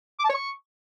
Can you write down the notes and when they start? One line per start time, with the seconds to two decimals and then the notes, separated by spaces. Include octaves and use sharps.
0.19 D6
0.25 A5
0.30 C#5
0.35 C#6